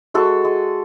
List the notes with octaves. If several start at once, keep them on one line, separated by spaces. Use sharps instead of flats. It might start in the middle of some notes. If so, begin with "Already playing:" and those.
G#3 F#4 A4
G#3